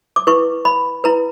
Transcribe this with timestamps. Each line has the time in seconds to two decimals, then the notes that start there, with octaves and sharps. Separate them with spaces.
0.16 D6
0.27 E4 B4 C#6
0.65 B5
1.04 E4 B4 A#5